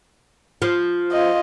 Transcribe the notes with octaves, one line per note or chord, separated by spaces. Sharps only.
F3
F4 D#5